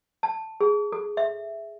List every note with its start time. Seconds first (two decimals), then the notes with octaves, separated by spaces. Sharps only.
0.23 A5
0.61 G#4
0.92 A4
1.17 E5